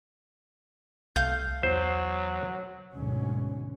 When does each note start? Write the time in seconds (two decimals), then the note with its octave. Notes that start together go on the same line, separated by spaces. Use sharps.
1.16 C2 A3 F5 G6
1.63 E2 F#3 C5
2.95 D2 G#2 B2 D3 F#3 C#4